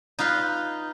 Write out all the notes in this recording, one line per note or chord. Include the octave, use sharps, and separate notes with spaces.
D#4 F4 B4 F5